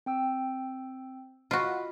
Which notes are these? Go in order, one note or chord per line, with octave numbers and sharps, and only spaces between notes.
C4 G5 E6
F4 F#4 D#5 B5